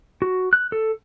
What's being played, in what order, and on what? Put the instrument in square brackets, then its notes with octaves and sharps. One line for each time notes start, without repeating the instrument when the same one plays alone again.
[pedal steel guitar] F#4
F#6
A4